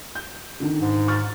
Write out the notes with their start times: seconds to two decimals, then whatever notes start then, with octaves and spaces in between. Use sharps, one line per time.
0.15 G6
0.60 D3 D#3
0.82 G#2
1.08 C#6 F6 A6